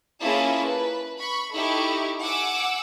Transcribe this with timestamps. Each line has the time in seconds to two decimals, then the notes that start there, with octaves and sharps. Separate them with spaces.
0.21 A#3 C#4 E4 F4 G#4 A5
0.63 B4
1.19 B5 C#6
1.54 D#4 E4 G4 A4 C#6
2.21 F#5 G#5 D6 E6